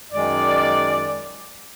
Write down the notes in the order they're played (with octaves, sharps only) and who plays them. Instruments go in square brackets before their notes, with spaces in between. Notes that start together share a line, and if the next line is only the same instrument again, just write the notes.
[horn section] F#2 D#3 G#3 D5